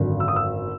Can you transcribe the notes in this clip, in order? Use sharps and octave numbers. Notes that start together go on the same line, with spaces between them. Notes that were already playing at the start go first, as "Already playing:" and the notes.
Already playing: G#1 F#2 D3
E6
D#6
E6